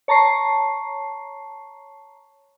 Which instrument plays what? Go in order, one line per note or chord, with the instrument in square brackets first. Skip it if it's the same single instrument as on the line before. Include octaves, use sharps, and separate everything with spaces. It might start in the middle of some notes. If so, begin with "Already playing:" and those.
[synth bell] C#5 A5 A#5 C#6 C7